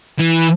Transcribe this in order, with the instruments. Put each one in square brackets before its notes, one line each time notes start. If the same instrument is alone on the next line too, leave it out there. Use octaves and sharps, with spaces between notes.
[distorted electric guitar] E3